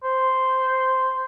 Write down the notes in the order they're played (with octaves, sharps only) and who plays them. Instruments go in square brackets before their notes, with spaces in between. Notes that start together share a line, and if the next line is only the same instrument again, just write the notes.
[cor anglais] C5